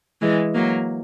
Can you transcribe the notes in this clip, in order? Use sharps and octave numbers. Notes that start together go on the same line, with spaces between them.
E3 G#3
F#3 A#3